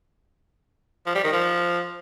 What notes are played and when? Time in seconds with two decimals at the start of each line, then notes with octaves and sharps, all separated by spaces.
1.06 F3
1.15 G3
1.24 D#3
1.32 F3